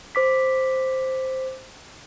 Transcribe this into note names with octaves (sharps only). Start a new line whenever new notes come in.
C5 D6 B6